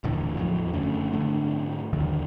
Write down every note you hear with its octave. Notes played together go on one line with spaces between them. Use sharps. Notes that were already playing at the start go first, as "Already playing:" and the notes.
D#1 A2 D3 E3
E2 F3 F#3
F#1 D3 A3 C#4
G#2 D3 A3 D4
D#2 D3 D#3 F#3